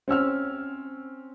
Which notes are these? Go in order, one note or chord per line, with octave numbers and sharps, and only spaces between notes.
C4 C#4 E6 F6